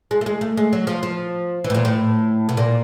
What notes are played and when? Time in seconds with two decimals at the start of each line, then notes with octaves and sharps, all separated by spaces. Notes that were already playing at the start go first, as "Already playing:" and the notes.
0.11 G#3
0.21 A3
0.26 G#3
0.41 A3
0.57 G#3
0.73 F#3
0.87 F3
1.03 F3
1.64 E3
1.70 A2
1.74 A#2
1.85 A2
2.49 B2
2.57 A#2